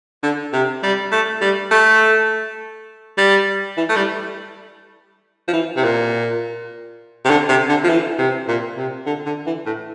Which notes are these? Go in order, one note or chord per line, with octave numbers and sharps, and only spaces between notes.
D3
C3
G3
A3
G3
A3
G3
E3
A3
G3
F3
E3
C3
A#2
C3
D3
C3
D3
F3
E3
C3
A#2
C3
D3
D3
E3
A2